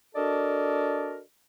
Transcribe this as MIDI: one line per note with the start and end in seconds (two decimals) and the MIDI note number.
0.15 1.20 62
0.15 1.20 66
0.15 1.20 69
0.15 1.20 70
0.15 1.20 74
0.15 1.20 75